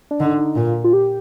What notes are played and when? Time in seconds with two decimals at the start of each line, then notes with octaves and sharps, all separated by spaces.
0.11 D4
0.20 D3 D#4
0.38 D#4
0.56 A#2 F4
0.84 F4
0.93 G4